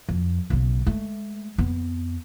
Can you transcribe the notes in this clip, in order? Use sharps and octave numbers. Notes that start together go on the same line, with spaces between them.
F2
B1 C#3
G#3 A3
F2 B3